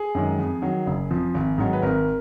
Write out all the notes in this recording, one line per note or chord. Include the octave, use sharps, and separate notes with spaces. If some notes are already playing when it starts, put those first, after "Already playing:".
Already playing: G#4
F#2 D#3 G#3
F2
D#3 F#3
F#1
F2 F3
G#1
G#2 D#3 F#3
B4
G#1 A#4